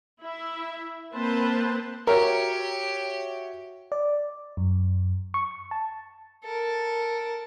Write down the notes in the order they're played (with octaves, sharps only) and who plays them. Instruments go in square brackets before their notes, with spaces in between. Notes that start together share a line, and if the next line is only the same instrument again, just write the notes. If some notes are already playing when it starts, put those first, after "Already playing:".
[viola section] E4 E5
A#3 C4 B4 C5 A5
[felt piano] F#4 C#5 E5 [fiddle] G4 [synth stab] A#4
[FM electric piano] D5
F#2
C#6
A5
[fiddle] A4 A#4